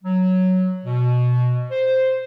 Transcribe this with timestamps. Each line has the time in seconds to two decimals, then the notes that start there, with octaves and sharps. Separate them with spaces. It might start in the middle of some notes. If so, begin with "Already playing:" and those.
0.04 F#3
0.85 B2
1.71 C5